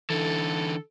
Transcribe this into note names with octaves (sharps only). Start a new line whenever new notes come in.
D3 E3 A4